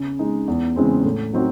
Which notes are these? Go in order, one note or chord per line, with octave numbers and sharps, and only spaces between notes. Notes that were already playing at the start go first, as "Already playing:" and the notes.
Already playing: C#3
G#3 D#4
E2
C#3 E3 G#3 C4
A2
F#3 C4 D#4 F#4